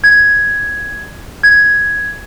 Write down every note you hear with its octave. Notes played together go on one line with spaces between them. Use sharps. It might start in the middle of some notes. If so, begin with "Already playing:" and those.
G#6
G#6